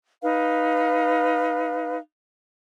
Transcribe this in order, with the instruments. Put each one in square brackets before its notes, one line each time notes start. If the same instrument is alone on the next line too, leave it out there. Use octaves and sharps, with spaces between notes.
[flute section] D#4 B4 F5